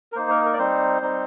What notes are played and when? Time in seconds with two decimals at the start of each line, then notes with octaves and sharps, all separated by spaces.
0.12 A#4
0.16 A#3 D#4 C5
0.30 A#4
0.45 A#4
0.54 D5
0.59 G3 C4 D#4 C5
1.01 G3 C4 D#4